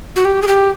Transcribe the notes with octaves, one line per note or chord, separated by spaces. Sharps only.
F#4
G4
G#4
G4